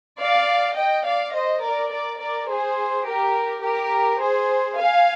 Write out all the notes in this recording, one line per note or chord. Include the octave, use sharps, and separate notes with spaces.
D5 F5
D#5 G5
D5 F5
C5 D#5
A#4 D5
A#4 D5
A#4 D5
G#4 C5
G4 A#4
G4 A#4
G#4 C5
F5 G#5